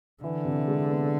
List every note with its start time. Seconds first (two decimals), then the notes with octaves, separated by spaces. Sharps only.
0.23 D3 E3
0.45 C3
0.68 G#3
0.89 B3